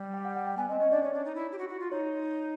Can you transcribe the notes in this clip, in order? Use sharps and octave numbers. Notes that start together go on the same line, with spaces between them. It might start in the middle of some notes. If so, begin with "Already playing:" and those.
Already playing: G3
G5
F#5
F#5
G5
B3 G#5
C4 D#5
C#4 D#5
D4 D5
C#4 C#5
D4
D#4
E4
G4
F#4
F#4
F4
D#4 C#5